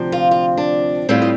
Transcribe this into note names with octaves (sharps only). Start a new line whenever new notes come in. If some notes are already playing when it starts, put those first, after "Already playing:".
Already playing: D2 C3 F3 C4
F4
F4
D4
A2 G3 C4 F4
D#5